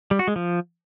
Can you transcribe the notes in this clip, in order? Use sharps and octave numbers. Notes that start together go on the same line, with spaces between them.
G3
F#4
G#3
F3